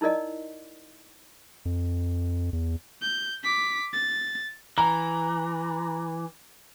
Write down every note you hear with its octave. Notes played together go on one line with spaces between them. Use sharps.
D#4 E4 A#4 D5 D#5
F2
E2
G6
D6 B6
A6
E3 A#5